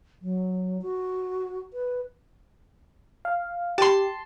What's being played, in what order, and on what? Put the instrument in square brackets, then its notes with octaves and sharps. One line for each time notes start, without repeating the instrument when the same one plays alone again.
[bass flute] F#3
F#4
B4
[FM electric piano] F5
[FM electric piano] G4 [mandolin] A5 C6